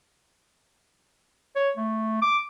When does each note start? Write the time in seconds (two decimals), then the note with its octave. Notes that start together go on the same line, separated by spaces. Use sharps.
1.56 C#5
1.77 A3
2.22 D6